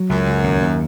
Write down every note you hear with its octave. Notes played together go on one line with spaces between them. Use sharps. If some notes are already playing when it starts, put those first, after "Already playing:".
Already playing: F#3
C#2 F#2
C#2
D#2
D#2